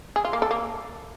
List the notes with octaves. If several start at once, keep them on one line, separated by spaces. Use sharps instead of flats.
G#4
F4
A#3
A4
A#3